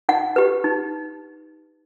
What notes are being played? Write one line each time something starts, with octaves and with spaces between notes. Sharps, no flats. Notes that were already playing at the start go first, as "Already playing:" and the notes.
D#4 F#5
G4 B4
D#4